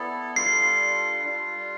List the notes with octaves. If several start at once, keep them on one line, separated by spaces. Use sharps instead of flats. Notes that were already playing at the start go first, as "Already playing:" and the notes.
Already playing: B3 E4 A4 D5
G3 D4 F4 A4 C7
G3 D4 F4